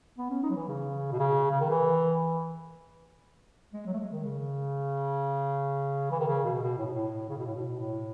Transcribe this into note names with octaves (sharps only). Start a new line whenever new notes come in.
B3
C#4
D#4
F#3
E3
C#3
B2
C#3
C#3
D#3
E3
G#3
F#3
A3
G#3
D#3
C#3
E3
D#3
C#3
B2
B2
A2
B2
A2
C#3
B2
A2
B2
A2